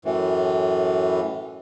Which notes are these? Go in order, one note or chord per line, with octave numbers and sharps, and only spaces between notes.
F#2 A2 E3